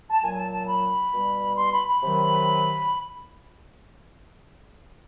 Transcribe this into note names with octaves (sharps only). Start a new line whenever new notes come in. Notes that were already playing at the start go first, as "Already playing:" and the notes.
A5
A#2 F#3 G#5
A5
A5
B5
B2 G3
C6
B5
B5
C3 D#3 F#3